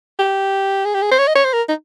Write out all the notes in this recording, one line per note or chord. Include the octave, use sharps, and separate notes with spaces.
G4
G#4
G4
G#4
C5
C#5
D#5
C#5
C5
A#4
D#4